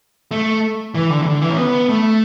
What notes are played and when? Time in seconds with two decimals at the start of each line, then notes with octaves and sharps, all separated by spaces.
0.31 A3
0.95 E3
1.10 D3
1.22 E3
1.26 D3
1.42 E3
1.50 C#4
1.57 B3
1.89 A3